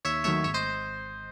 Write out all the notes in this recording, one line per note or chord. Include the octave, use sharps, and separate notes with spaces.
D#2 C#5 E5
D#3 F#3 A3 C#5 E5
G#1 C#5 E5
C5 D#5